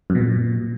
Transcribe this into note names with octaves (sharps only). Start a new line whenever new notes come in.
F#2
B2
A#2